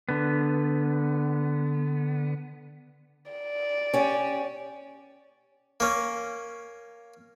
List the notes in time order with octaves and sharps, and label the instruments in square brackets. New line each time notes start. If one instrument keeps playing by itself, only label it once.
[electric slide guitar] D3 B3
[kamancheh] D5
[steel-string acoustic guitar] C#4 G4
[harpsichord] A#3 C#4